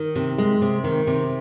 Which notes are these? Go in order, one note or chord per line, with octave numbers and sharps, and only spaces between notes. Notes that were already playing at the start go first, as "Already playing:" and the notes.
Already playing: D#3 A#4
C3
G#3
C3
D#3
C3